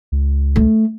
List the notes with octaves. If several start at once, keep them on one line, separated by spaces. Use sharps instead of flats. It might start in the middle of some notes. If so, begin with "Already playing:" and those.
C#2
A3